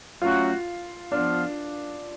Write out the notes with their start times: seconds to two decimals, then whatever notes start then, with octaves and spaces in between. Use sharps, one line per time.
0.21 F#3 A3 C#4 F4 F#4
1.12 F3 B3 D4 F4